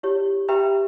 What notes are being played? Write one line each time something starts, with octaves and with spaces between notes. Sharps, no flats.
E4 G4 C#5
G4 B4 E5 G5 A#5 B5